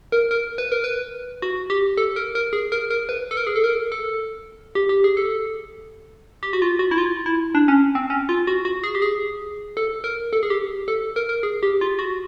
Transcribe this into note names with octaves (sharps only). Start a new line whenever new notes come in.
A#4
A#4
B4
A#4
B4
F#4
G4
A4
A#4
A#4
G#4
A#4
A#4
B4
A4
A#4
G#4
A4
A#4
A4
G4
G4
G#4
A4
G4
F#4
F4
F#4
E4
F4
E4
D4
C#4
C4
C#4
F4
F#4
F#4
G#4
G4
G#4
A4
A#4
A4
G#4
G4
A4
A#4
A#4
G#4
G4
F4
F#4